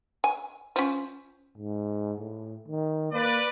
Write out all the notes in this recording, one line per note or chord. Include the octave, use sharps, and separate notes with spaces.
G#5
F3 C#4
G#2
A2
D#3
A#3 B4 D5